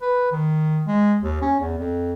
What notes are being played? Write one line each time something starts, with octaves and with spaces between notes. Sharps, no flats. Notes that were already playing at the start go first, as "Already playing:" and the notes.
B4
D#3
G#3
D#2
C#4
E2
F2